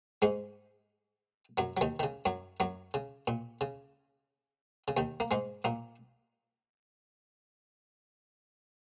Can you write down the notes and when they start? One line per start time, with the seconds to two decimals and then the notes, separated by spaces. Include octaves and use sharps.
0.22 G#2 G#3
1.58 F#2 F#3
1.77 F#3
1.81 D#2 D#3
2.00 D#3
2.03 C#3
2.26 F#2 F#3
2.60 F#2 F#3
2.94 C#3
3.28 A#2
3.61 C#3
4.88 C#3
4.97 D#2 D#3
5.20 A#3
5.31 G#2 G#3
5.64 A#2 A#3